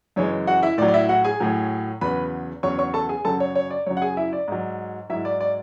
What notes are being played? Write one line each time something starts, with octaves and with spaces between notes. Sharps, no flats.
F#2 C#3 E3 G#3 C#5
F#4 F#5
E4 E5
A2 F#3 D5
D5
E4 E5
F#4 F#5
G#4 G#5
A2 F#3
E2 C#3 F#3 B4 B5
E2 C#3 F#3 C#5 C#6
C#5 C#6
A4 A5
G#4 G#5
F#2 C#3 F#3 A4 A5
C#5
C#5
D5
F#2 C#3 F#3 C#5
F#5
G#4 G#5
E4 E5
D5
G#2 F#3
G#2 F#3 E4 E5
D5
D5